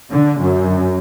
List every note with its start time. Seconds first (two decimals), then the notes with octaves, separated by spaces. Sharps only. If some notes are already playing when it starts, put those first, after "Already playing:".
0.11 D3
0.39 F#2